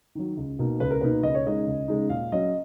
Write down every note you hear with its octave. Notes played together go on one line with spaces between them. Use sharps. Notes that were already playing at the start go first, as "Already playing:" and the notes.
D#3 F#3
C#2
B2 A#3 D#4
C#2 B4
A#4
B2 A#3 D#4 B4
C#2 D#5
C#5
C#3 G#3 D#4 D#5
C#2
C#3 G#3 D#4
A#2 F5
F#3 C#4 D#5